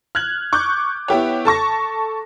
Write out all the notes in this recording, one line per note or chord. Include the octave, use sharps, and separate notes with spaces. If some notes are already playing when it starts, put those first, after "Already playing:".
F6 F#6 G#6 F#7
C#6 D6 F#6 G6
B3 E4 G4 C#5
A4 A5 C#6 A#6